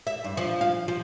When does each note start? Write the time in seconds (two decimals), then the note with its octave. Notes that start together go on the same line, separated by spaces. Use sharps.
0.07 E5
0.24 G2
0.37 F3
0.61 F5
0.88 F3